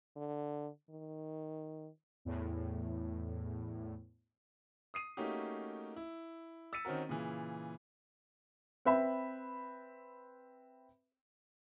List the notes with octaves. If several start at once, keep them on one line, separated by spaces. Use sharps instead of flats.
D3
D#3
E2 A2
D#6 C7 D#7
A3 A#3 C#4 D#4 F#4 G4
E4
E6 A6 B6 C#7 D#7
D#3 C4 C#4 F#4 A#4
A#2 C#3 E3
C4 B4 E5 B5